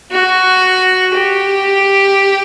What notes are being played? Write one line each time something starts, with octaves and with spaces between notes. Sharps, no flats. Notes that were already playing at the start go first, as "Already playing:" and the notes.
F#4
G4